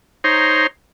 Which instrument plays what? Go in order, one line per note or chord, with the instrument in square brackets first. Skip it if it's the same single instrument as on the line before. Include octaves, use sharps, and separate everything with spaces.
[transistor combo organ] D#4 C5 C#5 A#5 C6